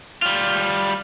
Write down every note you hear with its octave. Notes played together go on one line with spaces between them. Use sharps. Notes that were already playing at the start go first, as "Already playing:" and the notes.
G3 F4